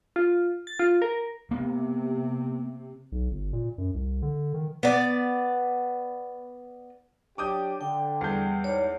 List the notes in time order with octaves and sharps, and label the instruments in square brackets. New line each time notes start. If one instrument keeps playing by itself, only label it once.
[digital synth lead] F4
A6
F4
A#4
[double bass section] C3 [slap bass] A#3 B3
[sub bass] B1
G1
A#2
F#2
C2
D3
D#3
[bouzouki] B3 D5
[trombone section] F#3 D4 G4 [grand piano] D6 D#6 G6
[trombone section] D3 [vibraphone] G5
[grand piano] E2 G#4 G6 [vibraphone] G3
[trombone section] G#2 G3 [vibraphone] C#5